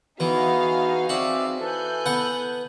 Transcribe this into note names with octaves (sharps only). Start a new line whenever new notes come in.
E3 B3 D#4 F#4 G#4 F5
C4 F#4 D5 E5
E3 A4 G#5 F#6 G6
B3 F#5